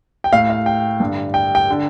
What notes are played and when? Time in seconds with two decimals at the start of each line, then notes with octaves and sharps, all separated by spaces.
0.24 G5
0.32 A2 F5
0.50 F5
0.66 G5
1.00 G2 D3
1.34 G5
1.55 G5
1.70 D3